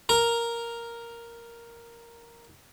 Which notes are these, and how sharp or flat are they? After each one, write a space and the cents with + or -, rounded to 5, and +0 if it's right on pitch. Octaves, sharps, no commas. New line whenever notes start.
A#4 +0 A#5 +0